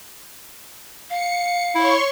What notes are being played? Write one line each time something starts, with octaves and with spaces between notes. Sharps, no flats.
F5 C#7
E4 C#5 C6 C#6